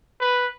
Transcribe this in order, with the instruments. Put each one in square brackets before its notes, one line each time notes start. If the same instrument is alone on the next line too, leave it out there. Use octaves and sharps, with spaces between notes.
[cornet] B4